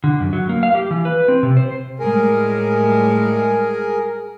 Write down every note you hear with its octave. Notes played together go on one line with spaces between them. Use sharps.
D3
F#2
F#3
A#3
F5
G4
E3
B4
C4
C3
C5
A2 G3 G#3 G#4 A#4